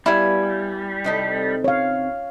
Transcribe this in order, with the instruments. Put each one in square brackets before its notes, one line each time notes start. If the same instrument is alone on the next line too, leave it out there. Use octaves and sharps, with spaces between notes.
[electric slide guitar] G3 [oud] B3 F5 [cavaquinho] E4 G#5
[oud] C3 D#4 A4
[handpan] C#5 F5